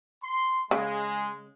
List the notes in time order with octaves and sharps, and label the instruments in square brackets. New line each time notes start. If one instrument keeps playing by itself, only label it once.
[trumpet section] C6
[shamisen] C#3 [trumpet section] G#3